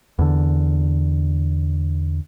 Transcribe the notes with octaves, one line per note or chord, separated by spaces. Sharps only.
E2 D3